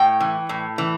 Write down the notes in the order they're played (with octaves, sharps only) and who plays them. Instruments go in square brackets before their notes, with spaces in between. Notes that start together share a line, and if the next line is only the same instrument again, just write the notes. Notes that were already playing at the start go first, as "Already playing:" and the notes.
Already playing: [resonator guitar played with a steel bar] A2 G5
E3
A2
E3